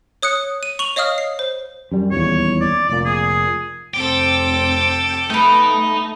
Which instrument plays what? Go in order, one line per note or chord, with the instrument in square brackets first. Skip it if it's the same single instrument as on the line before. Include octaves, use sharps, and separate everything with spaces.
[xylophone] C#5 D#6 F#6 C#7
D#7
C#6 F7 F#7
C#5 D#5 F5 D#6 F6
C7
C5
[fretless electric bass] F#2 G3
[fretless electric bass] D#1 E2 [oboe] C#5
[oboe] D5
[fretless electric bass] F1 A#2 [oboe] D5
[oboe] G#4
[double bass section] F1 C4 [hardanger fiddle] A4 D6 [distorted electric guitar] G5
[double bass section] A3 [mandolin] B3 G5 [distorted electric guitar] D#4